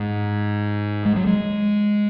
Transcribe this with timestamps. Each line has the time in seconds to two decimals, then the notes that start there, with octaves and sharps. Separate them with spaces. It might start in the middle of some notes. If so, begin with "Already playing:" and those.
Already playing: G#2
1.05 G#3
1.16 F#3
1.27 G#3